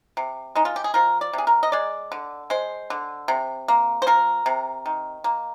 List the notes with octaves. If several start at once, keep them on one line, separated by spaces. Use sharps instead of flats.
C3
G#3 D#4
F4
G4
G#4
F3 A#4
D5
C3 G#4
A#4
D#5
G#3 D5
D3
G#3 C5
D3
C3
A#3
C5
F3 A#4
C3
D#3
A#3